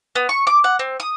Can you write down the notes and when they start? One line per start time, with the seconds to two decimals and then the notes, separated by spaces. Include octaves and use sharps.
0.15 B3
0.29 C#6
0.47 D6
0.64 F#5
0.79 C4
1.00 D#6